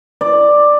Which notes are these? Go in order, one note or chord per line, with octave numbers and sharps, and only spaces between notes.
D5